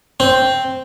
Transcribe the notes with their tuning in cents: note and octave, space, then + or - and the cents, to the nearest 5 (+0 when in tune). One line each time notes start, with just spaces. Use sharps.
C4 -5